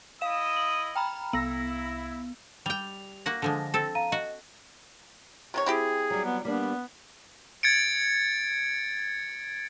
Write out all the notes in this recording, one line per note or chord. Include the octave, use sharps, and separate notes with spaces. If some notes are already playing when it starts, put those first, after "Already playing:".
E4 D#5 F5 D#6 E7
F#7
G5 A#5 B5 F6
C2 B3 E4 E6 A#6
G3 G5 F7
A#3 F#4 F#5 A#6
D3 F3 G#3
C4 A4
F5 A#5 D#7
F#4 D#5
C3 D#3 C#5
C4 E4 G4 G#4
F#3 G3
B3
G3 A#3 B3 D4
G#6 A6 C#7 D7